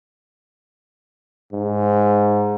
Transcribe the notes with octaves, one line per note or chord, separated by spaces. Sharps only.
G#2